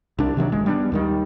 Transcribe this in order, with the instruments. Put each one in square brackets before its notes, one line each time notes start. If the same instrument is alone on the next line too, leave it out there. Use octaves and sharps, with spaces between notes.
[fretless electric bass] C2 D4
C3 D#3 F#3 D4
G1 G#3
G3 B3 C4 D4
D#2 D#3 G3